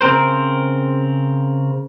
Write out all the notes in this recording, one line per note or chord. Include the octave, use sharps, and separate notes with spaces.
C#3 C4 A#4 C5